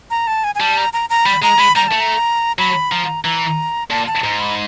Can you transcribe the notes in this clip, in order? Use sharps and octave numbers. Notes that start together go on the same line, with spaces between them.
A#5
A5
G#5
G#5
G3 A5
A#5
A#5
A#5
G3 B5
G#3 A#5
G#3 B5
G3 A#5
A3 A5
A#5
F#3 B5
F3 A#5
E3 A#5
A#2 A5
A5
G#2 A#5
B5